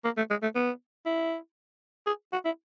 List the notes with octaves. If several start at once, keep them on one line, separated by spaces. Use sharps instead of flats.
A#3
A3
G#3
A3
B3
E4
G#4
F#4
E4